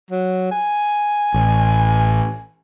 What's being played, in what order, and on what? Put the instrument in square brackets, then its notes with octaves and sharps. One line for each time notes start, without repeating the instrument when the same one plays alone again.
[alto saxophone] F#3
G#5
[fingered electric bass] A1